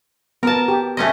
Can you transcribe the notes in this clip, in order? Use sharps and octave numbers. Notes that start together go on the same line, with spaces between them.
B3 A#4 A5
G4
A3 C#4 D#5